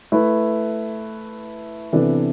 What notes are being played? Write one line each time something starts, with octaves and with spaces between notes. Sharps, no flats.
A3 E4 B4
C3 E3 B3 D4 A4